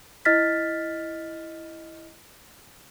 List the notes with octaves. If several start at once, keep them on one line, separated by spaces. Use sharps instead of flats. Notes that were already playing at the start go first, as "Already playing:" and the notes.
E4 D#5 F6 A6 B6